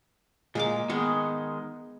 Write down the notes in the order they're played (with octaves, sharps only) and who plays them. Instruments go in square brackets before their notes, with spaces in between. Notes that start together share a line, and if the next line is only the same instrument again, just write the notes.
[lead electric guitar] A#2 [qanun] G#3 A#3 D6
[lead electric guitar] D#3 G#3 [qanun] B3 G#4